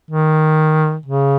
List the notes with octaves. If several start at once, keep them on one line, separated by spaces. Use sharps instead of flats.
D#3
C#3